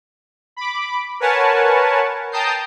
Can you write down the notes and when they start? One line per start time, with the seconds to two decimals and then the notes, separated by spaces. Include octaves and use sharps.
0.57 B5 D6
1.20 A#4 B4 C#5 F#5 G#5 A5
2.32 G5 A5 A#5 D#6 G6 C7